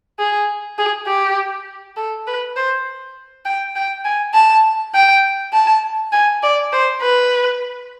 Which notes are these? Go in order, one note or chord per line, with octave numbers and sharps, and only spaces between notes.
G#4
G#4
G4
A4
B4
C5
G5
G5
G#5
A5
G5
A5
G#5
D5
C5
B4